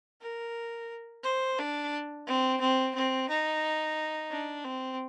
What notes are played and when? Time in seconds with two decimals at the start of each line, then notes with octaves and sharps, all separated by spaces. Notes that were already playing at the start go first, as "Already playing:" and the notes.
0.22 A#4
1.24 C5
1.59 D4
2.27 C4
2.61 C4
2.95 C4
3.29 D#4
4.31 D4
4.64 C4